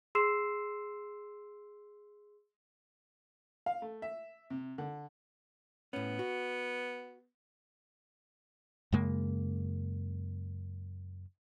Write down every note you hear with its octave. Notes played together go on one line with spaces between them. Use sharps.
G#4 C6 E6 C7 E7
F5
A3
E5
C3
D3
A2 B3 C#4
F#4
F#2 C#3 G#3 A#3